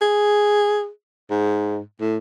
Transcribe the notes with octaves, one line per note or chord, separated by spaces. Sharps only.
G#4
G#2
A2